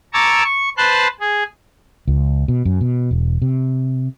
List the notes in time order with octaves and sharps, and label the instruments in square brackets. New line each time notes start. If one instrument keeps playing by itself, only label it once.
[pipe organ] A5 A#5 C#6 D6 E6 G#6
C#6
B4 C5 A5 C6 F#6
G#4
[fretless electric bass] C#2
B2
F#2
B2
E1
C3